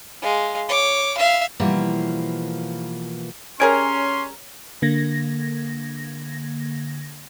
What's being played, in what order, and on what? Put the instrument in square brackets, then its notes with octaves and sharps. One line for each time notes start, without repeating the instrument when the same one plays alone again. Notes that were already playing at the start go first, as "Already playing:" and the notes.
[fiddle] G#3 F5
C#5 D6
E5 F5
[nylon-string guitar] B2 E3 F3 G3 A#3
[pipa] G3 G#4 A#4 [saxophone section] C#4 [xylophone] C#5 G#6 D7 [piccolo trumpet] C6
[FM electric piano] D3 A#3 G#6 A#6